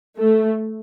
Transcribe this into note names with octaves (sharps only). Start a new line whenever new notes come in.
A3